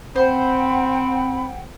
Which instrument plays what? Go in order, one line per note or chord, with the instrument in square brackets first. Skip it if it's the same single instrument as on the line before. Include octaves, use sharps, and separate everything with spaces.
[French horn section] C4 [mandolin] C5 [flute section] F#5 G5 [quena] B5